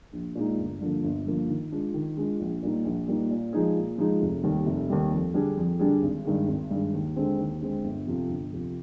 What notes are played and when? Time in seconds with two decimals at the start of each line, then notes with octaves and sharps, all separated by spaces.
0.13 A#1
0.35 A#2 G#3 D#4
0.58 G1
0.81 G2 D3 F3 A#3
1.03 G1
1.26 G2 D3 F3 A#3
1.49 D#3
1.72 G#3 D4 F4
1.94 D#3
2.17 G#3 D4 F4
2.40 A#1
2.63 A#2 G3 A#3 D#4
2.85 A#1
3.08 A#2 G3 A#3 D#4
3.30 A#2
3.53 F3 G#3 D#4 G#4
3.76 A#2
3.98 F3 G#3 D#4 G#4
4.21 F1
4.43 D#2 D#3 G3
4.66 F1
4.89 D#2 D#3 G3
5.12 F2
5.34 D3 G3 D4 G#4
5.57 F2
5.79 D3 G3 D4 G#4
6.02 G#1
6.25 G2 D#3 G#3
6.48 G#1
6.71 G2 D#3 G#3
6.93 D#2
7.16 D3 G#3 C4
7.39 D#2
7.61 D3 G#3 C4
7.84 G1
8.06 F2 C3 F3
8.29 G1
8.52 F2 C3 F3